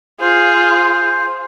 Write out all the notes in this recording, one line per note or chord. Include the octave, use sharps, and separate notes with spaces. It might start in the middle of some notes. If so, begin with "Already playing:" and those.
F4 G#4 C5